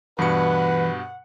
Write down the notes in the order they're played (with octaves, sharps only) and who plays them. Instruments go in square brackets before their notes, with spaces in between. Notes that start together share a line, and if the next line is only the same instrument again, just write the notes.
[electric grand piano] G2 B2 C#7 [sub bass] E3 [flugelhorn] B4 [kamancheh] F#5